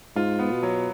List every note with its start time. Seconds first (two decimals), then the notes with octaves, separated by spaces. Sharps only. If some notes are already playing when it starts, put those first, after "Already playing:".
0.16 G#2 F4
0.39 B3
0.51 B2
0.63 F#3